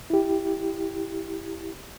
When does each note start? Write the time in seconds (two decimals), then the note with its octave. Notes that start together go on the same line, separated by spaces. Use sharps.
0.10 E4 G4